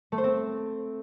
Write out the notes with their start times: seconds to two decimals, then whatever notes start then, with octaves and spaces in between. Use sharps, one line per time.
0.12 A3
0.18 C5
0.24 C4